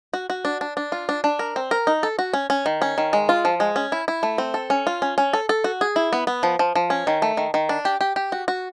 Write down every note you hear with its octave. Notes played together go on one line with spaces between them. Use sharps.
F#4
F#4
D4
D4
D4
F4
D4
D4
A#4
C4
A#4
D#4
A4
F#4
C#4
C#4
D#3
C#4
D#3
G#3
F4
F3
G#3
C#4
E4
E4
A3
C4
A4
C#4
F4
C#4
C#4
A4
A4
F#4
G#4
E4
B3
B3
F3
F3
F3
C#4
D#3
A3
D#3
D#3
D4
G4
G4
G4
F#4
F#4